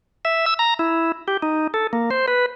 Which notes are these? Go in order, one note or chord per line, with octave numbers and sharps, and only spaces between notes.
E5
E6
A#5
E4
G4
D#4
A4
A#3
C5
B4